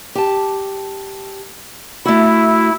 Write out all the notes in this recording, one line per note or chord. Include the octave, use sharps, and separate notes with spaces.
G4 A5
A3 E4 F#4